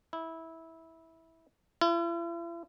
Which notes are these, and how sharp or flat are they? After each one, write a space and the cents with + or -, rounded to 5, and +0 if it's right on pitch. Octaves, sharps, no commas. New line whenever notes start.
E4 -15
E4 +45